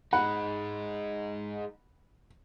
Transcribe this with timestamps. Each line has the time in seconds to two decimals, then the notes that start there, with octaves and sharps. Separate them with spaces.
0.13 G#3 D#4 F#5 B5